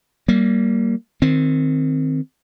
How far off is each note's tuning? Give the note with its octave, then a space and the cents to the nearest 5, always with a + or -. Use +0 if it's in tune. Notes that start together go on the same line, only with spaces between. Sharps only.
G3 -30 A#3 +0
D#3 +0 C4 +0